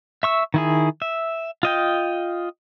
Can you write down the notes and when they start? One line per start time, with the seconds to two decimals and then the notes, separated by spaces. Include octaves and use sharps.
0.23 E5 C#6 E6
0.54 D#3 E4 G#4
1.02 E5
1.63 F4 D#5 G5